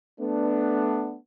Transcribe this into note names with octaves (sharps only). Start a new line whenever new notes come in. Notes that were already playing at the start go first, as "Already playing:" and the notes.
A3 B3 D4